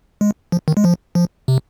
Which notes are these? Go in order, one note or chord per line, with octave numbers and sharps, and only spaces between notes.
G#3
F3
D#3
G#3
F3
F3
C3